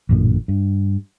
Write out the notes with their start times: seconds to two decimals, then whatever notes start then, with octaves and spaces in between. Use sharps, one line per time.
0.09 A1 F#2 A#2 D3
0.48 G2